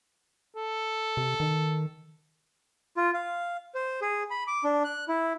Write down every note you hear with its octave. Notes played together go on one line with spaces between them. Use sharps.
A4
C3
D#3
F4
F5
C5
G#4
B5
D6
D4
F#6
E4